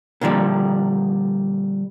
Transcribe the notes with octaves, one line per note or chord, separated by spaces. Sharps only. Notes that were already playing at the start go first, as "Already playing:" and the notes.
A#2 D3 F3 G3